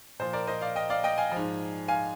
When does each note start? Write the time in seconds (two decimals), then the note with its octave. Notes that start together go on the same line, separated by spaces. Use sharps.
0.19 A#2 F3 C5
0.33 A#4 D5
0.47 C5 D#5
0.62 D5 F5
0.76 D#5 G5
0.90 D5 F5
1.04 D#5 G5
1.18 F5 G#5
1.32 G#2 F3
1.88 F5 G#5